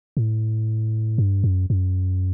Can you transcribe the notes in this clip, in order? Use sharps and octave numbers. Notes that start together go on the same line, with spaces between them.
A2
G2
F#2
F#2